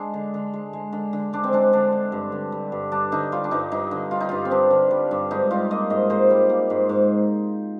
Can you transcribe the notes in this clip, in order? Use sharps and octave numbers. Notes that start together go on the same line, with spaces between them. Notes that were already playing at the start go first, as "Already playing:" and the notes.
Already playing: G#3 D4
D3
D3
G#3
G#3
D3
D3
G#3 D4
C4
G#3 D4
D3 D4
D3
G2
D3
G3
G2
G2 D4
D3 D#4
G3 F4
D4
G2 D#4
G2 D#4
D3
G3 F4
D#4
G2 F4
C4
G2 D4
D3
G3
G2
G#2 D#4
G3 F4
A#3 D#5
G#2 D#5
G#2 C5
G3
A#3
G#2
G#2